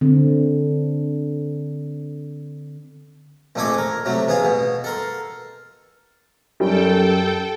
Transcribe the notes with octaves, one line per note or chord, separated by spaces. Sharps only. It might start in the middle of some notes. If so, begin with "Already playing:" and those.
D3 C4
A#1 F2 A3 A4 G#5 D6
A#4
C3 F#3 A3
A1 B3 G#4 F5
B2
A4 A#4 C6
F#2 G3 A4 G5